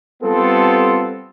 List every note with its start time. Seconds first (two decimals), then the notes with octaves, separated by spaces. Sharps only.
0.23 G3 B3 C4 F4 A4